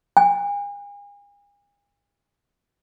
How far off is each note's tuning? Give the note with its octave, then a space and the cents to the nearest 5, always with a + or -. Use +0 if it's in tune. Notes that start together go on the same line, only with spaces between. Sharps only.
G#5 -40